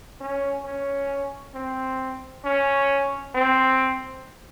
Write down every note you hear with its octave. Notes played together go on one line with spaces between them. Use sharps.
C#4
C#4
C4
C#4
C4